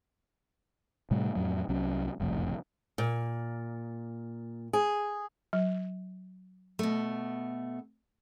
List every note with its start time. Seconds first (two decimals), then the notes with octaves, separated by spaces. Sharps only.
1.11 A2 C3 G3 A3
1.35 F2 A2 F#3
1.69 C2 F#3 C#4
2.20 F#1 C2 F2 A2
2.98 A#2
4.73 G#4
5.53 F#3
6.79 B2 A3